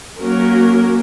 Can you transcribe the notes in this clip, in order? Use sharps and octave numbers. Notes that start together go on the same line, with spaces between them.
F#3 A#3 C#4 A#4